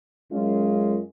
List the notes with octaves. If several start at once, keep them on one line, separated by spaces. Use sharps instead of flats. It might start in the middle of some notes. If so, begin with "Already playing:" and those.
F#2 G#3 C#4 F4